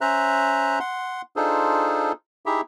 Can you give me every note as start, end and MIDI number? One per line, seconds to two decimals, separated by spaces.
0.01 0.79 61
0.01 0.79 72
0.01 0.79 76
0.01 0.79 82
0.01 0.79 90
0.80 1.22 78
0.80 1.22 84
1.36 2.12 62
1.36 2.12 63
1.36 2.12 65
1.36 2.12 68
1.36 2.12 69
1.36 2.12 72
2.46 2.61 63
2.46 2.61 64
2.46 2.61 67
2.46 2.61 68
2.46 2.61 76